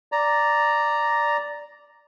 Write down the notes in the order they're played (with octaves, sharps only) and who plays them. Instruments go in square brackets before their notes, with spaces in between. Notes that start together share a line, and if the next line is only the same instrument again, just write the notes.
[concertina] D5 A#5